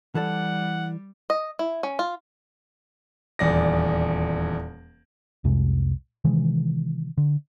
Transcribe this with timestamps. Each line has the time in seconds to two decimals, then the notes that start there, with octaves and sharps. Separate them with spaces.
0.15 E3 G3 A4 D5 F#5
1.30 D#5
1.59 E4
1.83 C#4
1.99 F4
3.39 D#1 E2 D5 A#6
5.44 C2 F2 C3 G#3
6.24 C3 D#3 E3 G#3
7.18 D3